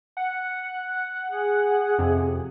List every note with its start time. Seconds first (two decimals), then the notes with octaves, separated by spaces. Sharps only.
0.17 F#5
1.31 G#4
1.98 F2 C3